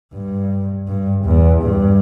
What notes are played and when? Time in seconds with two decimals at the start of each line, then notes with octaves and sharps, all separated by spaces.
0.13 G2
0.88 G2
1.26 E2
1.63 G2